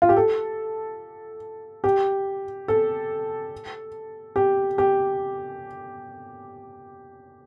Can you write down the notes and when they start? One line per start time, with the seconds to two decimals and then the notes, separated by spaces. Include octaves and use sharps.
0.02 F4
0.09 G4
0.17 A4
1.84 G4
2.68 A4
4.36 G4
4.78 G4